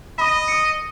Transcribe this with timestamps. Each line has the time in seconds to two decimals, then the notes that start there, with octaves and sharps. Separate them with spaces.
0.18 D#5 B5 D#6
0.48 D#6 C#7